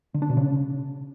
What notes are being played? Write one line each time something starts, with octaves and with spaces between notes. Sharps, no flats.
D3
D4
B2
C#3